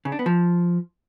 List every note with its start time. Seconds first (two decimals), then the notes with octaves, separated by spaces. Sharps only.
0.05 C#3
0.12 D4
0.19 B3
0.26 F3